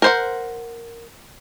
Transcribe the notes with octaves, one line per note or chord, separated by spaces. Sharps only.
A#4 C5 F#5